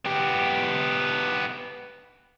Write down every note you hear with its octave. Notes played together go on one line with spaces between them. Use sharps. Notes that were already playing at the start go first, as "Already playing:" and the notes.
B3 G4